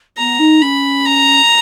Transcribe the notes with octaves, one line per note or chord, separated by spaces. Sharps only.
B3 A#5
D#4
C#4 B5
A#5